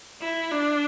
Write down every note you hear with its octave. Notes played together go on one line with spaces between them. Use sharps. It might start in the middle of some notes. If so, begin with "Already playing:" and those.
E4
D4